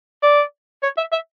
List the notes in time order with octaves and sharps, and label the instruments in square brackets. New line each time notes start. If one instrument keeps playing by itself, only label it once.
[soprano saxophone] D5
C#5
E5
E5